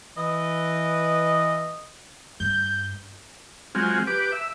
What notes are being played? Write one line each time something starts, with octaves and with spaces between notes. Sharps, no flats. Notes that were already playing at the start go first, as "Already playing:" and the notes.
E3 B4 D#5
G2 G6
F#3 G#3 C4 F4
G4 B4 D6
E5